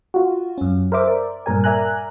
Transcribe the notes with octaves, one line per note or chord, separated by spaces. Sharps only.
F4 F#4
F#2 C#4
A#4 C5 E5 D6
A#4 D5
G2 A#2 A#4 G#5
A#4 D5 E5 G#5 A#5 F#6